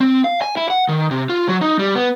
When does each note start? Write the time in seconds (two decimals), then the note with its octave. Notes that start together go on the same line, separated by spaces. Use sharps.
0.01 C4
0.24 F5
0.42 G#5
0.57 E4
0.70 F#5
0.89 D#3
1.11 C3
1.30 F4
1.49 F#3
1.61 D#4
1.79 G3
1.95 B3